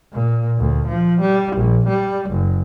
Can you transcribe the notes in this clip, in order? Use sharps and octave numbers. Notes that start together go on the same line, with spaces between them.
A#2
D2
F3
G3
A#1
G3
F#1